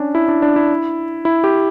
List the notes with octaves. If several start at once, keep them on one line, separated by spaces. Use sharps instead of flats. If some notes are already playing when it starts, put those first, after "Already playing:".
Already playing: C#4 D4
E4
D4
D4
E4
E4
G4